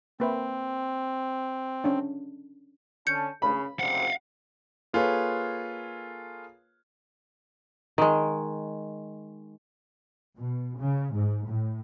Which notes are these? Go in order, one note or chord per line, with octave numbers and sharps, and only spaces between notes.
A#3 C4 B4 E5
C#4 D4
D3 C#4 A5 G6 C#7
C#3 B5
F#1 D2 C3 F5 F#5
A#3 F4 G#4 A4 B4 C#5
D#3 G#3
B2
C#3
G#2
A2